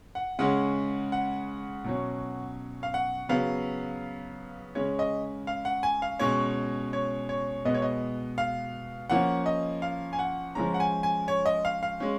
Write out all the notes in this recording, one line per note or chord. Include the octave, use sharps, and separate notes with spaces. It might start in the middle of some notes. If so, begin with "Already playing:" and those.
F#5
C#3 G#3 C#4 F#5
F#5
B2 F#3 C#4
F5
F#5
C#3 F#3 B3 F5
C#3 G#3 C#4 C#5
D#5
F5
F#5
G#5
F5
B2 G#3 C#4 C#5
C#5
C#5
B2 G#3 B3 D#5
C#5
D#5
F5
F3 A#3 C#4 F#5
D#5
F5
G#5
F#5
F3 G#3 C#4 A#5
F#5
G#5
G#5
C#5
D#5
F5
F5
G#3 C#4